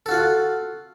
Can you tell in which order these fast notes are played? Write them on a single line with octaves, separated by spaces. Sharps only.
A4 F#4 F4 F#5